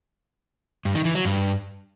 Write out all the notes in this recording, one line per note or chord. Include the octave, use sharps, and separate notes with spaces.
G2
D#3
E3
F#3
G2